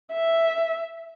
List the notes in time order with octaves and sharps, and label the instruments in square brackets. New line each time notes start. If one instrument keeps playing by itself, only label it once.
[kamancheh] E5